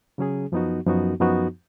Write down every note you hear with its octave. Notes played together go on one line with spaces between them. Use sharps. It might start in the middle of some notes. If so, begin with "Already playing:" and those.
C#3 F#3 C#4 G#4
F#2 F3 B3 D#4 F#4
F#2 F3 B3 D#4 F#4
F#2 F3 B3 D#4 F#4